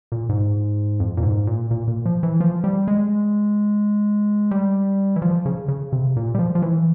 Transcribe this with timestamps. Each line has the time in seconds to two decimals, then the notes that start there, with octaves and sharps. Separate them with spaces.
0.12 A#2
0.29 G#2
1.00 F2
1.17 A#2
1.23 G#2
1.47 A#2
1.71 A#2
1.88 A#2
2.06 F3
2.23 E3
2.40 F3
2.64 G3
2.88 G#3
4.51 G3
5.16 E3
5.22 F3
5.46 C#3
5.68 C#3
5.93 C3
6.16 A#2
6.35 G3
6.39 F3
6.55 F3
6.62 E3